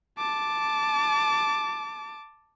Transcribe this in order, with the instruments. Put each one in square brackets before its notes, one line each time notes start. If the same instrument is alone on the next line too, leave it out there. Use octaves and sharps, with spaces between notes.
[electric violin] A5 D6